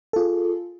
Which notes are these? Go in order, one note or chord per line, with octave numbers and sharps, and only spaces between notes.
F4 G#4 A4